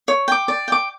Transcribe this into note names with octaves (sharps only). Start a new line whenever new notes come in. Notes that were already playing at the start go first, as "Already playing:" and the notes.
C#5
G5 D6
D5
G5 D6